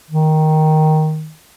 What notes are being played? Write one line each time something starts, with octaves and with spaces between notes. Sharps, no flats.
D#3